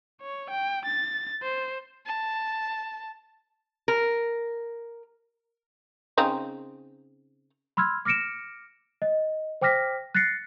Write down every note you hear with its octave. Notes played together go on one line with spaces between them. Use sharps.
C#5
G5
A6
C5
A5
A#4
C#3 C4 D#4
B5 C6 E6 F6 G#6
D6 F6 A#6 C#7 D7 E7
D#5
C5 G5 D6 F6 A#6 B6
F#6 A6 A#6 C7 C#7